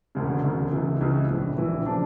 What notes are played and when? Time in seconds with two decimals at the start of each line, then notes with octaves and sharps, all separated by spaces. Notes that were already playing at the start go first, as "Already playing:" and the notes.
0.15 E1 D2 C#3
0.44 E1 D2 C#3
0.73 C#2 C#3 E3
1.01 C#2 C#3 E3
1.29 A#1 A2 E3
1.58 A#1 A2 E3
1.86 C#3 F3 A3 D4